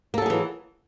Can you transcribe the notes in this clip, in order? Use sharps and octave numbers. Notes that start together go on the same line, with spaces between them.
E3 F#3 A#3 G#4 A4